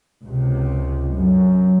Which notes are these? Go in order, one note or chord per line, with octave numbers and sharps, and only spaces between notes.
C#2 C3
F#2